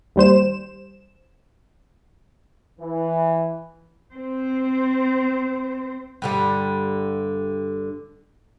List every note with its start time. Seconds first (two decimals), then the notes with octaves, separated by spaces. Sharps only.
0.16 D#2 G3 C5 E7
2.79 E3
4.14 C4 C5
6.22 G2 D3 G3